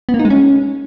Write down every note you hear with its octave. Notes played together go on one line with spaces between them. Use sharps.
B3
A#3
D#4
G#3
C#4